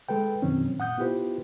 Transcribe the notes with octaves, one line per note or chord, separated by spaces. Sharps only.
G#3 A4 B4 G5
F#2 B2 D#3 F#3 C4 C#4
A#2 F#5 D#6 G6
B3 E4 F4 G4 B4 C5